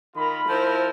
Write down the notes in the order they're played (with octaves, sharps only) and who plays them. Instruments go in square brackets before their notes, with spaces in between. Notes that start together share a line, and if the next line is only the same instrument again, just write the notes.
[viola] D#3 A#4 [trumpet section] F4 B5
[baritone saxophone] F3 [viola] E4 A#4 [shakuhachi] C5